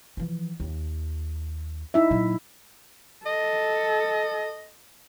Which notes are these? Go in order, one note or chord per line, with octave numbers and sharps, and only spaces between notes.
E3 F3
D#2
D#4 E4 E5
A#2 F#3
A4 D#5